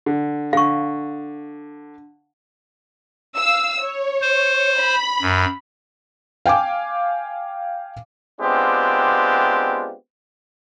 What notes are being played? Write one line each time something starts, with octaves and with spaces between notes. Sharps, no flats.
D3
D3 F5 C#6
F5 E6
C#5
C5
B5
F#2
F5 G5 G#5 D6
G#3 B3 C4 D4 F4 G4